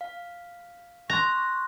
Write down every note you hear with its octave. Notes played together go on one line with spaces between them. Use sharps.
F5
A#5 C6 C#6 F#6 A#6